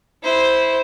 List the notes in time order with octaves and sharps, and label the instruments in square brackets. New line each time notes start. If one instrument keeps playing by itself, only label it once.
[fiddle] E4 C5